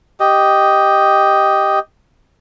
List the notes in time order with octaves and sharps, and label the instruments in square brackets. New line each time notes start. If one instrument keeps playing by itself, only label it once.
[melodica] G4 D#5